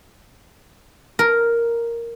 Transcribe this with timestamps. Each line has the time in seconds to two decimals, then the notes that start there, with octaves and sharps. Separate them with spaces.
1.19 A#4